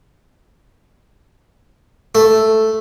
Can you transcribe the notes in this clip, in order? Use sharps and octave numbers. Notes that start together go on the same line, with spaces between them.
A3